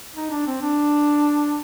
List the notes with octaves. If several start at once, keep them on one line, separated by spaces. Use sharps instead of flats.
D#4
D4
C4
D4